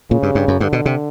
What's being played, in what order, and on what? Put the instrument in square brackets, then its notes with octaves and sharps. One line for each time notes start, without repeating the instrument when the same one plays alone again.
[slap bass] A#2 [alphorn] C#3
[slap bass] G2
G2
F#2
[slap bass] G2 [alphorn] D3
[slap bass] B2
C3